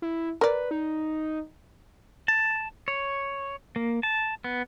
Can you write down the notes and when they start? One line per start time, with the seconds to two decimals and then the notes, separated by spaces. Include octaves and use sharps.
0.02 E4
0.41 A#4 B4 D5
0.71 D#4
2.28 A5
2.88 C#5
3.76 A#3
4.03 A5
4.44 B3